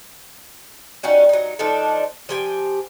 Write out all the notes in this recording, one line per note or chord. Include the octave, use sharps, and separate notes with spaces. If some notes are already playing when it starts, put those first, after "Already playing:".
G3 C#4 D#4 F#4
F#3 D#4
F3 D4 D#4 A4
F3 G4 G#5